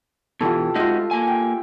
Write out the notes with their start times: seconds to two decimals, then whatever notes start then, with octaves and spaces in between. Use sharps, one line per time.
0.41 B2 E3 F4 G4 A4
0.75 G#3 D#4 F4 F#4 E5
1.11 A#3 G#5
1.27 G5